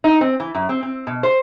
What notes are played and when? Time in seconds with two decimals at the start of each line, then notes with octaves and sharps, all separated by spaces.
0.04 D#4
0.21 C4
0.40 E3
0.55 F#2
0.69 C4
0.83 C4
1.07 B2
1.23 C5